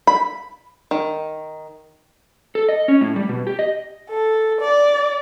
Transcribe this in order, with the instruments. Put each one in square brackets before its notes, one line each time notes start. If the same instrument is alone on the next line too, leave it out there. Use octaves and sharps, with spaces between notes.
[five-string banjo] B5
D#3
[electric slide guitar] A4
D#5
C#4
A2
G3
B2
G4
D#5
[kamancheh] A4
D5